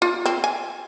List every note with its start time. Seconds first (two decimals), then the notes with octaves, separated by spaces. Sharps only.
0.02 F4
0.26 C4
0.44 G#5